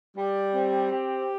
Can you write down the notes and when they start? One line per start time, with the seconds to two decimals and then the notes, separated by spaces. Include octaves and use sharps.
0.16 G3
0.54 C4
0.92 G4